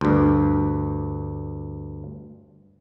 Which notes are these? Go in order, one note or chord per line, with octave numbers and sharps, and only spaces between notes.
D2 G2